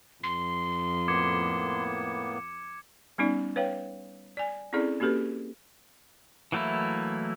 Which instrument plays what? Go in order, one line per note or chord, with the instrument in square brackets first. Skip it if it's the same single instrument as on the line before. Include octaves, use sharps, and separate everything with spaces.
[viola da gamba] F2 [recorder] C6
[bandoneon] A2 A#3 B3 [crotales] D6 G#6 C#7
[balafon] G3 B3 C#4 D#4 D5
B4 C#5 F5 G5
D5 G#5
C4 C#4 E4 G#4 A4 D5
A#3 C#4 F#4 G4 A4 B4
[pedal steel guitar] E3 F#3 A3 A#3 E4